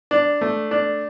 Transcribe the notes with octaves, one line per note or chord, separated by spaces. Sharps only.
D4
A3
D4